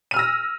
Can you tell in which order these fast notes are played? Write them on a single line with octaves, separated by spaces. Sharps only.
D#7 F6 E6 A#6